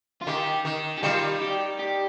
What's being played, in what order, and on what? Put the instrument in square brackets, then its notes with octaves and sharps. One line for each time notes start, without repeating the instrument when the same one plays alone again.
[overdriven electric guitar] F4
[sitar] D#3 [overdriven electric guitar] G4
[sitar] D#3
[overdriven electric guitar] G4
[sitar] D#3 G3 [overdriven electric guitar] F4
[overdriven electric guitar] G4
G4